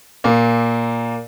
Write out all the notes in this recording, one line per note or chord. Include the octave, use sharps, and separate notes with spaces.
A#2 A#3